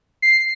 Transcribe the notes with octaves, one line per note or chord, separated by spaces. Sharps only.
C7